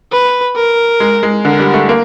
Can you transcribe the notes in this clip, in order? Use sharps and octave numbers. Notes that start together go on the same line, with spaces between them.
B4
A#4
G#3
G#3
D3 A#4
G3
A3
A#3